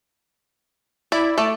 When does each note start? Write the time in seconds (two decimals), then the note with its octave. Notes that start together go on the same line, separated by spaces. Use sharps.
1.12 E4 D5
1.38 A3 D5